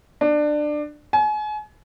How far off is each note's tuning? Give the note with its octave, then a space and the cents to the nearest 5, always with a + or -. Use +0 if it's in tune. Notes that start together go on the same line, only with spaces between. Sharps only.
D4 +20
G#5 +35